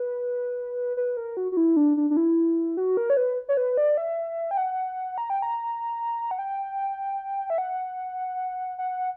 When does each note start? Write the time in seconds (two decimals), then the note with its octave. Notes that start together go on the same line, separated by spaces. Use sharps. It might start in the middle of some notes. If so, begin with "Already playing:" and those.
Already playing: B4
0.97 B4
1.17 A#4
1.37 F#4
1.52 F#4
1.57 E4
1.76 D4
1.97 D4
2.10 D4
2.17 E4
2.77 F#4
2.97 A#4
3.10 C#5
3.17 B4
3.49 C#5
3.57 B4
3.77 D5
3.97 E5
4.51 G5
4.57 F#5
5.18 A#5
5.30 G5
5.42 A#5
6.31 F#5
6.39 G5
7.50 E5
7.58 F#5
8.78 F#5